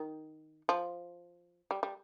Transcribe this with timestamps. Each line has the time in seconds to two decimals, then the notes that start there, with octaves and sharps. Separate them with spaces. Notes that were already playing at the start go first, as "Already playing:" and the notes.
Already playing: D#3
0.69 F3
1.71 G3
1.83 G3